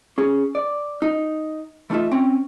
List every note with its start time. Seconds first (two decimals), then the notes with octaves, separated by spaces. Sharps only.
0.18 C#4 G#4
0.55 D5
1.02 D#4
1.90 E3 A3 D#4 F4 E5
2.11 C4 C#4 G5